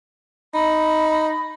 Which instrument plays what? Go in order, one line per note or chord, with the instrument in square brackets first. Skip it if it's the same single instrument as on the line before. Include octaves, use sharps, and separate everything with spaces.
[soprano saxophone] D#4 [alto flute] B5